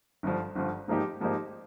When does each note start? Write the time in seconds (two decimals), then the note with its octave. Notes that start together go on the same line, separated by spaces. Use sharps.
0.23 G1 G2 F3
0.55 G1 G2 F3
0.88 G#2 F3 A#3 D#4 G4
1.21 G#2 F3 A#3 D#4 G4